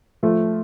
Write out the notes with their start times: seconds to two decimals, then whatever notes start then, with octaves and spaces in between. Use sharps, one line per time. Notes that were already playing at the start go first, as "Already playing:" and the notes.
0.23 F3 A3